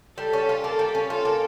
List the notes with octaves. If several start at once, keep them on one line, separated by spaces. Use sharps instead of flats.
G3 A4
C#4
F4
A#3 A4
G3
C#4
F4 A4
A#3